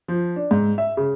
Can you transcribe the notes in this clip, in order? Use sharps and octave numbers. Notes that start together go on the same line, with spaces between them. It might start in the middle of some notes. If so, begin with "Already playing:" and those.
F3
D4
G#2
E5
C#3